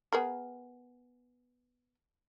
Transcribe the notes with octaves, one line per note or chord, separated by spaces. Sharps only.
B3 G#4 A#4